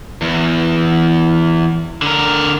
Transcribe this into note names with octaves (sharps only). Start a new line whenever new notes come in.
E2
D3 A#4